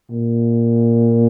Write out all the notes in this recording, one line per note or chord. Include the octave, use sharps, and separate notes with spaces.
A#2